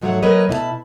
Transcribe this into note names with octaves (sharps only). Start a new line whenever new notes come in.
F2 G#2 F#3 A3 C#5 F#5
F#3 A#3 A#4 B4 C#5 D#5
B2 E4 D#5 A5